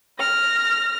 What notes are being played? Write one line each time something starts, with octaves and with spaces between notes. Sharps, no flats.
F6 A#6